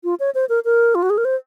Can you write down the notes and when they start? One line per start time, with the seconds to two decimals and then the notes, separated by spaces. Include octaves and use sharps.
0.04 F4
0.20 C#5
0.35 C5
0.49 A#4
0.65 A#4
0.95 F4
1.03 F#4
1.10 G#4
1.18 A#4
1.25 C5